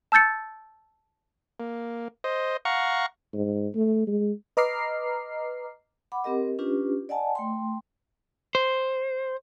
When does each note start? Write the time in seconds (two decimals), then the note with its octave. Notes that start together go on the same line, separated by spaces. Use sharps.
0.12 A5 E6 G6 A6 C#7
1.60 A#3
2.24 C5 D#5
2.65 F5 F#5 A#5 C#6
3.34 G#2
3.75 A3
4.07 G#3
4.57 B4 D#5 A#5 D6 F6 C7
6.12 F#5 B5 D6
6.24 C4 G4 A#4 D#5
6.59 C#4 D4 F4 G4 B4
7.09 D5 D#5 F#5 G#5 A5
7.35 A3 G5 C6
8.55 C5